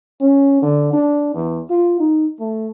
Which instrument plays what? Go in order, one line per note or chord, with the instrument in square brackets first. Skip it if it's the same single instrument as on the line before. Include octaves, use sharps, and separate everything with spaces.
[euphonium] C#4
D3
D4
E2
F4
D#4
A3